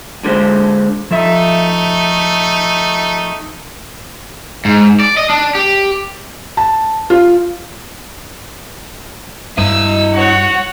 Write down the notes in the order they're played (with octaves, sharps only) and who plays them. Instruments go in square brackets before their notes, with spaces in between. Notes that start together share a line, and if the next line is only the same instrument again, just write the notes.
[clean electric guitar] D3 G#3 C5
[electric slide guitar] F3 A4 E5 [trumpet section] A3 D#4
[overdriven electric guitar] G#2
D5
D#5
D4
G4
[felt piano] A5
F4
[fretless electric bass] G2 [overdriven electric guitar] E4 D#5 [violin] E6 E7
[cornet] F#4 [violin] C#5 F#5